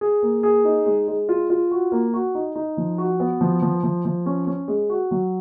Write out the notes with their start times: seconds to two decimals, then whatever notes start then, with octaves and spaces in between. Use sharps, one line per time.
0.01 G#4
0.22 A#3
0.43 G#4
0.65 D#4
0.86 G#3
1.08 G#3
1.29 F4
1.50 F4
1.71 F#4
1.92 A#3
2.14 F#4
2.35 D#4
2.55 D#4
2.77 F3
2.98 F#4
3.20 B3
3.41 F3
3.62 F3
3.83 F3
4.05 F3
4.26 C#4
4.47 C#4
4.68 G#3
4.90 F#4
5.11 F#3